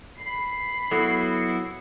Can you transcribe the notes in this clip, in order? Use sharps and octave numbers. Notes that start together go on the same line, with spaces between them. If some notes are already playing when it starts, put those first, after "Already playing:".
B5 C7
F#3 B3 E4 F#4 A4